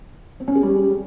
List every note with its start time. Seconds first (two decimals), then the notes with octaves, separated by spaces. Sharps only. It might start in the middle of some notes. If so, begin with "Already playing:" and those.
0.40 C4
0.48 C#4
0.55 G#4
0.63 G3